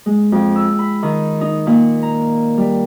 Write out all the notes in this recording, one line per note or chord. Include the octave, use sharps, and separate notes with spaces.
G#3
F2
E6
B5
D#3
D#4
A#2
A#5
G3